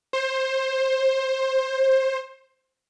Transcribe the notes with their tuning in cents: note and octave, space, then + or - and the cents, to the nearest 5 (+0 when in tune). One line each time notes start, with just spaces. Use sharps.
C5 +20